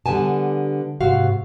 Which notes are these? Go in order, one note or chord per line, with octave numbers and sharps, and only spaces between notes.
D3 G3 B3 G#5 A5
G#2 C3 F#4 F5